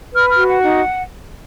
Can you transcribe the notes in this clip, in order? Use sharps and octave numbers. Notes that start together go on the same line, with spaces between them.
B4 F6
F6
F#4
F#5
D#4